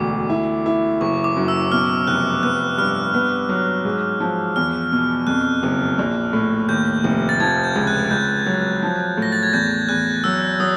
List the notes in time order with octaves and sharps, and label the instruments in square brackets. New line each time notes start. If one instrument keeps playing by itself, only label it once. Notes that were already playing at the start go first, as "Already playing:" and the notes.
Already playing: [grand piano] E1 D2 [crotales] D6
[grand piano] E4
E4
[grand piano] F#1 [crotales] C#6
[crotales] D6
[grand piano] F#2
[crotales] E6
[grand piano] B2 [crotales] F6
[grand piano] F1 [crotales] F#6
[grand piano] B3 [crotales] F#6
[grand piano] G2 [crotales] F6
[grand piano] B3
F#3
G#2
F3
[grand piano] E2 [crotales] F6
[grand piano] B2
[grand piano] F2 [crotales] F#6
[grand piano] F#1
A#1
A2
[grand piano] D#2 [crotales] G6
[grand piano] F1
[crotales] A6
[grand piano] F3 [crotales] G#6
[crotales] G6
[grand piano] C#2
[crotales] F#6
[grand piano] C#2 [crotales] G6
[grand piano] F#3
F3
[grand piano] A2 [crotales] A#6
[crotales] A6
G#6
[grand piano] E2 [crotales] G6
[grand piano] E2 [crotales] F#6
[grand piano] F#3 [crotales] E6
[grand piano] F#3 [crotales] D#6